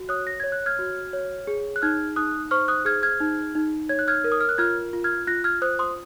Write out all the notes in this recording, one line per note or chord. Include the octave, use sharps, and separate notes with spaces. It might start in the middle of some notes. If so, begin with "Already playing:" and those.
Already playing: F#4
C#5 D#6 F#6
A#6
C#5 G#6
F#6
F6 G#6
F#4
C#5
G#4
F#6
D#4 F6 G#6
D#4 D#6 F#6
C5 C#6 F6
D#6 F#6
G#4 F6 G#6
F6 G#6
D#4
D#4
C#5 G#6
F#6
F6 G#6
A#4
D#6
F6
F#6
F4 F6 G#6
F4
F6 G#6
F4 F#6 A#6
F6 G#6
C5 D#6 F#6
C6 D#6